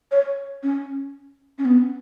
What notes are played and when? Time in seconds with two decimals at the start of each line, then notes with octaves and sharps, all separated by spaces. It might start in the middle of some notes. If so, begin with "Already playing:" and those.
0.12 C#5
0.63 C#4
1.58 C#4
1.65 B3